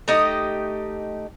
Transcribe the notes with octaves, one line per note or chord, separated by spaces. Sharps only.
A3 D#4 G4 D#5